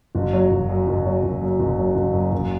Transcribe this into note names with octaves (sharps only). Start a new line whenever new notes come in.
F#1
F#3
F#1
F#2
F#1
F#3
F#1
F#2
F#1
F#3
F#1
F#2
F#1